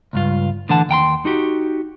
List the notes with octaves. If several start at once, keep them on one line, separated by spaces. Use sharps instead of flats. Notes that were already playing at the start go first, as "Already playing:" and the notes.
C#2 G2 F4
A2 D3 E3 F#5 A5
D#2 G5 A#5 C6
D#4 F#4 G4